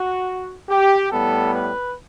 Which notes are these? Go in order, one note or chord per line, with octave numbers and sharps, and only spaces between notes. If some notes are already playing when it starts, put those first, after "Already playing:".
Already playing: F#4
G4
A2 G3 B3 A4
B4